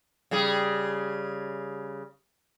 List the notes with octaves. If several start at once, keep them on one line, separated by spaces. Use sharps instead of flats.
C#3 G3 G#4